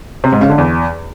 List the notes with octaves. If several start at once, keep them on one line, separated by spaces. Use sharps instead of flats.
C3
G#2
C#3
D3
E2